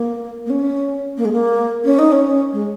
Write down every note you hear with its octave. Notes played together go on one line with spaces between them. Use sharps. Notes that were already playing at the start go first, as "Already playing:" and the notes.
Already playing: A#3
A#3
C#4
A#3
G#3
A#3
C#4
D#4
C#4
G#3